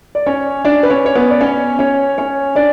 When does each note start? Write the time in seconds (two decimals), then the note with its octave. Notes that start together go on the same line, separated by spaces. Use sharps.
0.15 D5
0.26 C#4 C#5
0.65 D4 D5
0.83 B4
0.90 C#4 C#5
1.06 C#5
1.15 B3 B4
1.30 D5
1.41 C#4 C#5
1.79 C#4 C#5
2.18 C#4 C#5
2.55 D4 D5